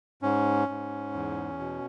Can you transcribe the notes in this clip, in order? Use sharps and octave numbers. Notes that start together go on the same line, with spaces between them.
G#2 C#4
G#2
E2
B2